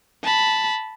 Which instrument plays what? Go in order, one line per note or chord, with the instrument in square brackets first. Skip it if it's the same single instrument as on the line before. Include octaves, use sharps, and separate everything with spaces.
[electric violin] A5 B5